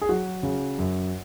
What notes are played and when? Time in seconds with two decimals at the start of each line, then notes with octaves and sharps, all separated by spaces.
0.01 G#4
0.09 F#3 F#4
0.43 C#3
0.78 F#2